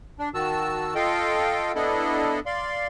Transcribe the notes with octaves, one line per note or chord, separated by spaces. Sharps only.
D4
D#3 F#4 A5 E6
F4 A4 D#5 F5 G5
B3 D4 E4 A4 D#5
D5 F5 C6